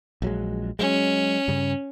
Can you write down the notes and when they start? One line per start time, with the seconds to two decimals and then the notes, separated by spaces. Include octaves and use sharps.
0.22 A#1 F#3 G#3
0.79 F#3 G#3 C#4
1.48 G2 C#3